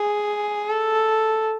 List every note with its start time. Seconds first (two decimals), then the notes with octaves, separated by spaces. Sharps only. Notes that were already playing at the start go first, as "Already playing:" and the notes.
Already playing: G#4
0.70 A4